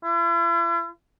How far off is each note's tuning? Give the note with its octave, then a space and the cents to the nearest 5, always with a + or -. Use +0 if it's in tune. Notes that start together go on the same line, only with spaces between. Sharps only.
E4 +45